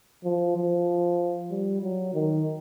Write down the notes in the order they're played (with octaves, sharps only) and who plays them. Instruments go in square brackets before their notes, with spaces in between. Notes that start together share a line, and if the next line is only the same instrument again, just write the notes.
[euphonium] F3
F3
G3
F#3
D#3